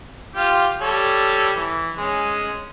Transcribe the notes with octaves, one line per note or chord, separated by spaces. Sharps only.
F4 G4
G3 A4 C#5
E3
G#3 C#4